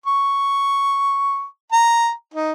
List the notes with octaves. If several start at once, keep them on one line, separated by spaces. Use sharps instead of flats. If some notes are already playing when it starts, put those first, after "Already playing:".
C#6
A#5
D#4